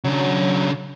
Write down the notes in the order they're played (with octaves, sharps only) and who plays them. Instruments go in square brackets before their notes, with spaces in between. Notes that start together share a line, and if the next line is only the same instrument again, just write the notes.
[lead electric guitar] C#3 D4 [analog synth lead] F#3